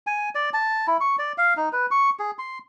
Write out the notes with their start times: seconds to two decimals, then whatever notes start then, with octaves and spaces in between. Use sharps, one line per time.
0.07 G#5
0.35 D5
0.53 A5
0.87 E4
1.01 C#6
1.19 D5
1.38 F5
1.57 D#4
1.73 B4
1.91 C#6
2.19 G#4
2.39 C6